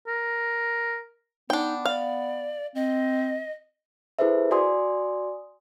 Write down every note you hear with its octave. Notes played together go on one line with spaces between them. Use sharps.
A#4
B3 D4 D#4 G5
D5 F5
C4 D#5
E4 G#4 A4 B4 C5 E5
F#4 D5 G#5 C6 D#6